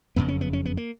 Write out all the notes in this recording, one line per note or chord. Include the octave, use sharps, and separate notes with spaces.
F#1 F2 C#3 B3
C#4
B3
C#4
B3
A#3